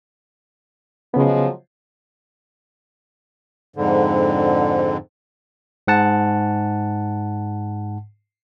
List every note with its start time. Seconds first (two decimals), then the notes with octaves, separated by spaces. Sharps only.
1.14 C#3 F3 F#3 G#3 B3
3.76 F2 G#2 D3
5.88 G#2 F#5 A5